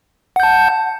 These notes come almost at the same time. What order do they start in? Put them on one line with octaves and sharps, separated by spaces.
F#5 G6 A5